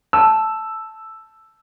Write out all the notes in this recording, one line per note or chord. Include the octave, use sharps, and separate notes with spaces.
A5 E6